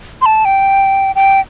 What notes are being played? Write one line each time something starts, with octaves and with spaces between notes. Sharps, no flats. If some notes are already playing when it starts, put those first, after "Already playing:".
C6
A5
G5
G5